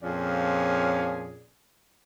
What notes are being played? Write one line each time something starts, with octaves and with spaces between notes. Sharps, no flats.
F2 A#2 F3 C#4 G#4 D5